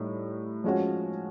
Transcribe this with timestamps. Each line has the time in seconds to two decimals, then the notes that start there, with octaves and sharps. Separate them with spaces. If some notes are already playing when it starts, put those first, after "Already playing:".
Already playing: A2 G3 D#4
0.64 F3 G#3 C#4 F#4